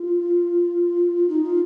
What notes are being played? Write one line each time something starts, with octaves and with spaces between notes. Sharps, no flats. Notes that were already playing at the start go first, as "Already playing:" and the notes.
Already playing: F4
D#4
F4